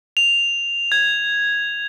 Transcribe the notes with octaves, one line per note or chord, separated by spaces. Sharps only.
F7
G#6